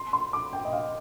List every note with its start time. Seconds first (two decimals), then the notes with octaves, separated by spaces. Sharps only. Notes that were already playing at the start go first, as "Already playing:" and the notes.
Already playing: C6
0.13 C6
0.33 D6
0.53 G5
0.65 D#5
0.73 F5